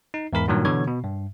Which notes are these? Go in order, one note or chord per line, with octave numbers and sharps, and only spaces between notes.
D#4
E2 G#2 A#4 B5
G2 A#2 D#3 F#3
B2 D3 E3 C#5 G#6
B2
G2